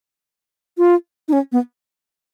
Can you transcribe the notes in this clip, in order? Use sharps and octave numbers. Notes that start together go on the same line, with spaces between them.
F4
D#4
C#4
B3